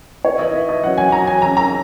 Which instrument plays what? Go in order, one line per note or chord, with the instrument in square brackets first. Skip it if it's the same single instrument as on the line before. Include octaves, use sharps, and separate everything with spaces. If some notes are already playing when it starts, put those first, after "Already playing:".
[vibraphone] E4 B4 E5 [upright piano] C#5
[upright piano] D#5
E5
D#5
[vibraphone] F#3 C#4 F#4 C#5 [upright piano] F#5
[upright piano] G#5
A#5
G#5
[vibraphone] C#4 G#4 C#5 [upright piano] A#5
[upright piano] A#5